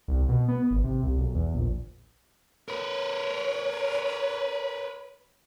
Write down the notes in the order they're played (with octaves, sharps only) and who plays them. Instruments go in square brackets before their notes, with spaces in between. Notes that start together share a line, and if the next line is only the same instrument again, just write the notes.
[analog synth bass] C2
B2
B3
G#1
C3
C2
B1
E2
A#1
[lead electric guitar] A#4 B4 [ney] C#5